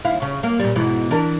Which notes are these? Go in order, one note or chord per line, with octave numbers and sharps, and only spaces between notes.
D#2 E4 F5
C#3
A#3
A#2 G3
G#2 B2 E3
E3 D4 A#4